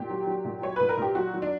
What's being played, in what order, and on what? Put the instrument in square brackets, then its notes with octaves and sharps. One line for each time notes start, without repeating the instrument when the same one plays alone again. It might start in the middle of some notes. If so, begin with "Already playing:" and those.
Already playing: [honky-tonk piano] A#2 G4
F#3
F#3
A#2
F#3 C#5
A#2 B4
A#4
A#2 G4
F#3 F#4
F#3
D4